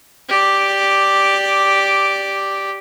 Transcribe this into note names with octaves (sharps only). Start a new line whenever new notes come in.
G4 D5